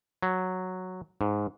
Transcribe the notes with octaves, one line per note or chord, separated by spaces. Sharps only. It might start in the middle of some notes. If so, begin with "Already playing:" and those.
F#3
G#2